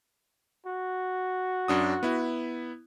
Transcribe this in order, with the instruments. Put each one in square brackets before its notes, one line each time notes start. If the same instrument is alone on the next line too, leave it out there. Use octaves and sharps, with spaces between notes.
[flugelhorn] F#4
[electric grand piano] F#2 D4 D#6
B3 E4